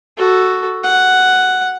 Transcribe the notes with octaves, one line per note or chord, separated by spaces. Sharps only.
F#4 A4
F#5